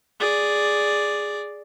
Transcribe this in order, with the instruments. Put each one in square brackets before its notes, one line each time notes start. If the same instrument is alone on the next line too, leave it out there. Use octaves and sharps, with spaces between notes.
[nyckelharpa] G#4 D5